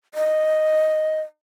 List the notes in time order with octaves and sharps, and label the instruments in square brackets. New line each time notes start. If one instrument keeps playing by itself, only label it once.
[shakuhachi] D#5